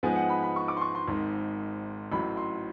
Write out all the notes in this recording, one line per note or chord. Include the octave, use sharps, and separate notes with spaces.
G#2 F3 G#3 B3 G#5
F#5
B5
B5
C#6
D6
C6
C#6
C6
G#1 G#2 D#3
A1 A2 F#3 B5
C6